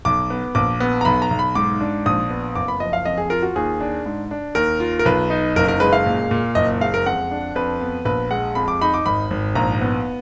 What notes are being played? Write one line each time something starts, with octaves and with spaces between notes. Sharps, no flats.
B1 D6
B3
A#1 D6
B3
A#5
B1 B5
A#5
B1
B5
G#2 D6
D4
A#1 D#6
B3
F#1 D6
B5
F3 D#5
F5
F2 D#5
G#4
F4 A#4
F#4
D#2 G#4
D4
G#2
D4
D#2 A#4
F4
A#4
B1 B4
D#4
F#1 A#4
A#4
G#3 B4
F5
A#2
A#2
F#1 D#5
G#3 F5
A#4
F2 F#5
D4
F2 B4
B3
A#1 B4
G#3 F#5
F2 B5
D6
D#4 B5
D6
G#1 B5
G#1
A#1 A#5
B3